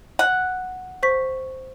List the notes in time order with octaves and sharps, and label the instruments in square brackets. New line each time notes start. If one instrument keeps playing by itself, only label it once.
[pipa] F#5
[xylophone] C5 C#6 B6